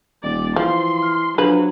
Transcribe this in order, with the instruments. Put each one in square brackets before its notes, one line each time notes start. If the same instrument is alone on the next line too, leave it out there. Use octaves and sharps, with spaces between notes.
[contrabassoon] D#1 [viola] D5
[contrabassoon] E3 [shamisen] F3 [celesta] F5 [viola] C6
[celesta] F6
[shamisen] F3 B4 [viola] F#3 [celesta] D4 F#7